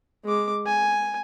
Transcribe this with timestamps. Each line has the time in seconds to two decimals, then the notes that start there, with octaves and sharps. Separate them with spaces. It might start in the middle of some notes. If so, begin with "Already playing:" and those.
0.25 G#3 D6
0.66 G#5